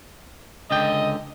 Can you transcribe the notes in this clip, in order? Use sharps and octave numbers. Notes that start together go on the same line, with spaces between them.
C#2 D3 D#5 G5